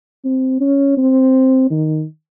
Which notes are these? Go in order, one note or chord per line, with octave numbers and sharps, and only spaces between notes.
C4
C#4
C4
D#3